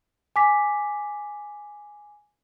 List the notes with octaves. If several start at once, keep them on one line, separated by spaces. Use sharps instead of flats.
G#5 D6 B6